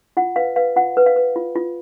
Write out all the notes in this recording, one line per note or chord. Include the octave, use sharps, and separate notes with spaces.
F4 F#5
B4 F5
B4 F5
F4 F#5
B4
F5
B4
F4
F4